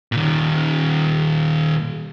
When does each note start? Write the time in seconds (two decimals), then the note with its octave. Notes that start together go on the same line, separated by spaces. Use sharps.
0.12 A#2 D#3